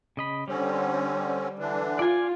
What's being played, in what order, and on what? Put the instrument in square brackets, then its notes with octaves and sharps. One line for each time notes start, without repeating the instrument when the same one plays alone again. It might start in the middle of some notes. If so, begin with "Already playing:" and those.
[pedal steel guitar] C#3 D#5 B5
[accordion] D3 C4 C#4 [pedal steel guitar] G3
[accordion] D3 E3 D4
[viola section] F4 [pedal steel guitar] D5 G#5